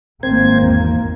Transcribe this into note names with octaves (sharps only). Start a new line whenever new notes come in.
G#1 A#3 C4 C5 G#6
E2